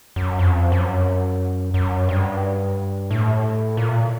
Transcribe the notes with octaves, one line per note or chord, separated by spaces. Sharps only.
F#2
F2
F#2
F#2
G2
A2
A#2